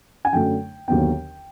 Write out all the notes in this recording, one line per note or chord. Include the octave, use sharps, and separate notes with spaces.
G#5
F#2 D3 F#3 A3 G5
D#2 D3 F#3 B3 G5